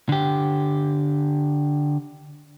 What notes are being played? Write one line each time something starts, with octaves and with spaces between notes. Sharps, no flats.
D3 G4